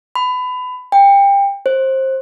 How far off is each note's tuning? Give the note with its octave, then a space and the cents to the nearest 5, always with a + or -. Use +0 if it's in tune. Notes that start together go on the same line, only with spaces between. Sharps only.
B5 +25
G5 +25
C5 +20